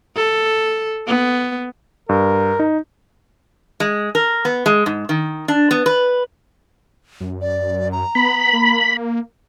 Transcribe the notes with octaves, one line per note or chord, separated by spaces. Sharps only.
A4
B3
G2 A#4
D#4
G#3
A#4
B3
G#3
G#2
D#3
D4
B3
B4
F#2
D5
A#5
B3 B5
A#3